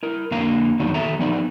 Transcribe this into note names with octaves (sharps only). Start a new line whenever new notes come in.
E4 A#4
F2 D3 A#3 D4 F5 A#5
F2 D#3 F#3 B3 D4 D#4
D#3 A4 E5 A#5
F3 B3 D#4 D5